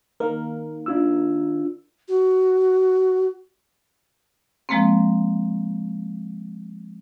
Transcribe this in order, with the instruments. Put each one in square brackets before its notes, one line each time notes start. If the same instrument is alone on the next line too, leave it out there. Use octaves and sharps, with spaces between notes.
[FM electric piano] D#3 A#3 A#4
[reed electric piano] D4 F4 E6
[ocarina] F#4
[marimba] F3 G#3 A#3 C4